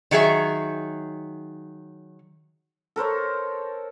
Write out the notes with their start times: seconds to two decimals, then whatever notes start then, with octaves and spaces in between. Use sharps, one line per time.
0.11 D#3 F#3 G#4 E5
2.96 A4 A#4 C5 C#5